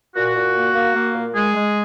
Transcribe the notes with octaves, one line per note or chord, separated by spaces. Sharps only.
A#2 F#4
A#2
A#3
A#3
A#3
A#2
G#3 G#4
G#3